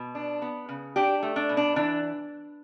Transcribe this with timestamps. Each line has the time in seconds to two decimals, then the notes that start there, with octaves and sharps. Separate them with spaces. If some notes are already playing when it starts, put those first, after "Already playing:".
Already playing: B2
0.15 D4
0.42 B3
0.69 C#3
0.96 D4 G4
1.23 A3
1.36 D4
1.49 B2
1.57 D4
1.76 E3 D4